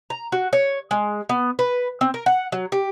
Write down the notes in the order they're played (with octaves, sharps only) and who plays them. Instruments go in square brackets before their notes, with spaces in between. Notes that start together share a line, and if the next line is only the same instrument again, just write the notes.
[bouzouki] A#5
F#4
C#5
G#3
B3
B4
C4
A#4
F#5
F#3
G4